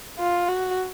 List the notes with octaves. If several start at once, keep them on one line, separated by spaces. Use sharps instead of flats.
F4
F#4